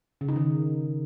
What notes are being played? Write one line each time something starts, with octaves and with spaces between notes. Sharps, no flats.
C#3
D#4
D#3